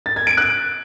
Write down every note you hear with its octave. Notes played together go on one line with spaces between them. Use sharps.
A6
G#6
D7
F#6